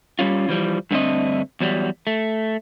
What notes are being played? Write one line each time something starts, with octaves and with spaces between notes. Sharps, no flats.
G3 G#3 C#4 F4
E3 F3 G3
G2 D3 A3 C4 D#5
E2 F#3 G3
A3